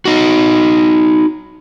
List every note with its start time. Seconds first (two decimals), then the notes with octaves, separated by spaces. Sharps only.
0.05 D#4 F#4